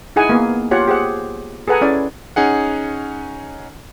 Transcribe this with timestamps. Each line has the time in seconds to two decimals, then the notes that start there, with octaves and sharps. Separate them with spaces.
0.16 D#4 E4 G#4 F#5 G#5
0.29 A#3 B3
0.71 F4 G4 C#5 F#5
0.88 G4 G#4 C5 F#5
1.68 G#4 A4 B4 F#5 G#5 A#5
1.82 C#4 E4 D5
2.36 C#4 D#4 G#4 F#5